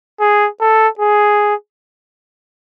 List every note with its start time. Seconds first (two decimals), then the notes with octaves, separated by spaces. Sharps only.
0.20 G#4
0.60 A4
0.99 G#4